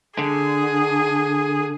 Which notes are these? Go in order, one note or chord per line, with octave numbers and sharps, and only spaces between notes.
D3 G#4